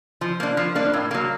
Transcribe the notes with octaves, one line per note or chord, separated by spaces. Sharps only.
F3
A#3 D4
F3
A#3 D4
A2
F#3 A#3